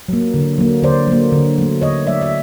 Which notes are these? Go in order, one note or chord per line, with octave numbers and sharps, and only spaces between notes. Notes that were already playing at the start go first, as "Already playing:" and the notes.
F#3 A#3
D3
F#3 A#3
D3 C5 D5
F#3 A#3
D3
F#3 A3
D3 C#5 D#5
F#3 A3 D5 E5
E5